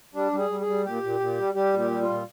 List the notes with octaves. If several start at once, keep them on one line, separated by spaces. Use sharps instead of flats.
G3 D4
G3
G#4
G3
G#4
G3
A#2 G4
A#2
A#2
G3
G3 G4
A#2
G4
G3
F4
A#2